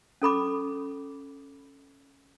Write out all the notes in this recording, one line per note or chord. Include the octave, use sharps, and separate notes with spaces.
C#4 A4 B5 D6